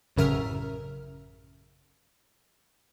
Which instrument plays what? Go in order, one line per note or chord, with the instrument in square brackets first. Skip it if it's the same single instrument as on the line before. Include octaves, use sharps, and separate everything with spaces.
[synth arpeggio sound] A1 F#2 C#3 A#4 E5 F6